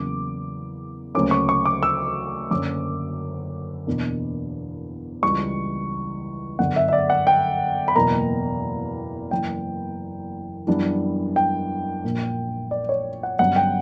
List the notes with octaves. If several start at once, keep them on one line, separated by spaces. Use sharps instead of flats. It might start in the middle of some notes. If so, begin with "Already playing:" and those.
Already playing: E2 C#3 F#3 A#3 D6
D2 C#3 F#3 A#3 C#4 D6
C#6
C#6
D6
E6
F#1 F#2 D3 F#3 C#4 D6
E2 B2 A#3 D4
C#2 C#3 E3 G3 C#6
G1 F#2 D3 F#5
E5
E5
D5
F#5
G5
B5
F#1 E2 B2 F#3 A#3 A#5
F#1 F#2 E3 G5
F#2 E3 G3 B3 D4
G5
A#1 A#2 A#3
D5
C#5
F#5
G1 G2 F#3 C#4 F#5
G5